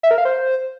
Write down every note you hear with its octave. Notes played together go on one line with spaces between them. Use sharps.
E5
A#4
F5
C5